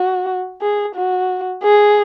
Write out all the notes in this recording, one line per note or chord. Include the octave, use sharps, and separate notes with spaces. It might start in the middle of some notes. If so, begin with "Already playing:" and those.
Already playing: F#4
G#4
F#4
G#4